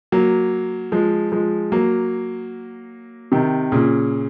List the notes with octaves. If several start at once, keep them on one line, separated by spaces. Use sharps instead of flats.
F#3 A#3
F3 G#3
F3 G#3
F#3 A#3
C3 D#3
A#2 C#3